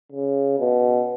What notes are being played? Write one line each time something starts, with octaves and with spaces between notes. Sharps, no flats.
C#3
B2